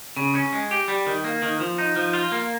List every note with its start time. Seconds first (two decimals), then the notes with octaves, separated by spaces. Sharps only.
0.16 C#3
0.35 C#4
0.53 G#3
0.71 G4
0.88 G3
1.07 D#3
1.24 A#3
1.42 D#3
1.60 F3
1.78 D#4
1.96 F3
2.13 F4
2.32 A#3